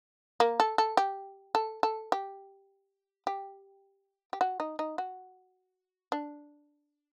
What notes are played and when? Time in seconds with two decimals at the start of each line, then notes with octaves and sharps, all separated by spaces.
0.40 A#3
0.60 A4
0.78 A4
0.97 G4
1.55 A4
1.83 A4
2.12 G4
3.27 G4
4.33 G4
4.41 F#4
4.60 D#4
4.79 D#4
4.98 F#4
6.12 D4